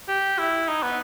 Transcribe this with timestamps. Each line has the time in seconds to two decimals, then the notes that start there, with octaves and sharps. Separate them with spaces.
0.08 G4
0.38 E4
0.68 D#4
0.83 B3